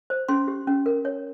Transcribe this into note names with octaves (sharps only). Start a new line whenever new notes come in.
C5
C#4 C6
G4
C#4
A#4
C#5